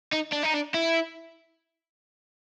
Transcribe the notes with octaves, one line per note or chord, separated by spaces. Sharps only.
D#4
D4
D#4
D4
E4